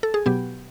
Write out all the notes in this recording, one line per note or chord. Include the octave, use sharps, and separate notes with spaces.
A4
G#4
B2 F#3 B3 G4